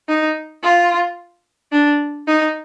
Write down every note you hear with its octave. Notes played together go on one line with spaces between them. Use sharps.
D#4
F4
D4
D#4